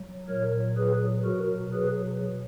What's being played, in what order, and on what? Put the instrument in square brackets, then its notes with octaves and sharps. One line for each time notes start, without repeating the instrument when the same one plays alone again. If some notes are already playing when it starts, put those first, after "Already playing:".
Already playing: [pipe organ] F#3
A#2 F#3 A#4 C#5
G#4 B4
B2 F#3 F#4 A#4
G#4 B4